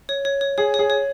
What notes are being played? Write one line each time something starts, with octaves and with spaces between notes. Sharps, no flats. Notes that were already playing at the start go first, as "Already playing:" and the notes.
C#5
C#5
C#5
G#4 C#5
C#5
G#4
C#5